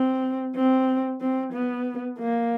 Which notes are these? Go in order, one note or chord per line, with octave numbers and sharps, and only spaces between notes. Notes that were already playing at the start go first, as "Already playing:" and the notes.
Already playing: C4
C4
C4
B3
A#3